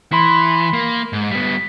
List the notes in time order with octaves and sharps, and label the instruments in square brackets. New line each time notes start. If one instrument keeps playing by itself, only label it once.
[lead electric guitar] E3 [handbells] B5 C6 B6
[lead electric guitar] A#3
G#2
[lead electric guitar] G3 B3 [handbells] B6